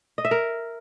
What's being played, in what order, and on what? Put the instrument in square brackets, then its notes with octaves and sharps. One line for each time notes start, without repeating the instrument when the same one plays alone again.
[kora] D#5
E5
A#4